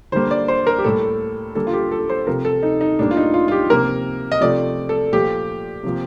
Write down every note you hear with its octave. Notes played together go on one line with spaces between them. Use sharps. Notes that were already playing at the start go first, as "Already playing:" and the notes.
D3 G3 A#3 C5
D5
C5
A#4
G4
A2 G3 A#3 A4
D3 G3 A#3 A4
F4
G4
A4
C5
C3 F3 A3 A#4
A4
D#4
D#4
A2 G3 A#3 D4
F4
D#4
F4
F4
G4
C3 F3 A#3 A#4
D#5
C3 F3 A3 D5
A4
A#2 F3 A3 G4
C3 F3 A#3